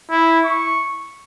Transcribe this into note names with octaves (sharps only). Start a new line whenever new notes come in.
E4
C#6